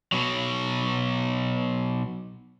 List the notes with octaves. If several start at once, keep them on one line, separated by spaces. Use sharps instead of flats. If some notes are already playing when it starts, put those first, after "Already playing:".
B2 F#3